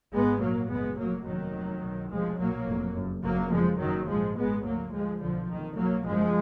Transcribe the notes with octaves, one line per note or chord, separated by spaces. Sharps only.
G#1 G#2 G#3 B3
A#1 A#2 F#3 A#3
F#1 F#2 G#3 B3
F1 F2 F#3 A#3
F1 D#2 D#3 F#3
F1 F2
B1 B2
F1 D#2 F3 G#3
B1 A#2 F#3 A#3
F1 F2
F#1 F#2
F#1 F2 F#3 A#3
F#1 F2 F3 G#3
F#1 F#2 D#3 F#3
A#1 G#2 F3 G#3
G#1 G#2 G#3 B3
D2 F#3 A#3
D2 F3 G#3
B1 B2 D3 F3
F#1 F2 D#3
B1 B2 F#3 A#3
F#1 F#2 F3 G#3